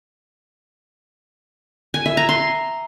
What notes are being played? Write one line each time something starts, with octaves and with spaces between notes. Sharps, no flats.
G#5
E5
A#5
C6